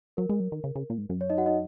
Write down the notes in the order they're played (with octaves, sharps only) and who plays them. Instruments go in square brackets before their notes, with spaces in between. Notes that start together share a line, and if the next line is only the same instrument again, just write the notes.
[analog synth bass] F#3 [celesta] A#4
[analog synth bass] G#3
F#3
D#3
C#3
C#3
A#2
G#2
F#2
[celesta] C#5
D#4 D#5
F#4 F#5
D#4 D#5